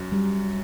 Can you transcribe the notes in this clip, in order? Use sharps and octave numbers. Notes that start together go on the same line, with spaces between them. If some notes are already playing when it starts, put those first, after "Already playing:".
Already playing: F#2 F#3
G3